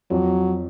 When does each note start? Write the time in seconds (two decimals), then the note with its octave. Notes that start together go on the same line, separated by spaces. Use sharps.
0.11 F2 F#3